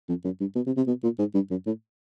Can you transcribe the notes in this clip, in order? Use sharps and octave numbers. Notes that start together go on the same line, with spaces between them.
F2
F#2
G2
B2
C3
C3
B2
A#2
G#2
G2
F#2
A2